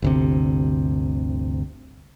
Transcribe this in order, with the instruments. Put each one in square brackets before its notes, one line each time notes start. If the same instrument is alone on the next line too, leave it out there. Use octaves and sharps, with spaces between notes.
[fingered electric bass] G1 D2 C3